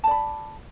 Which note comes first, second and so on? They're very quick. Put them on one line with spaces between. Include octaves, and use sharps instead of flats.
A5 D5 B5